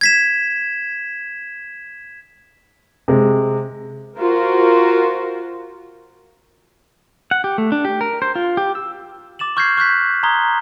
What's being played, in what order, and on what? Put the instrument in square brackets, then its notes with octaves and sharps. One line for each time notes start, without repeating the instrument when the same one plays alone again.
[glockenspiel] G#6 B6 E7
[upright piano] C3 G#3
[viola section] F4 F#4 A#4 C5
[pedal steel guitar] F#5
G4
A3
D4
G4
A#4
C5
F4
G4
E6
[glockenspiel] D6 A6 E7 F#7
C#6 F6 G6 G#6 A#6 C7
C#6 F#6 G6 B6
A#5 C6 D#6 G#6 G7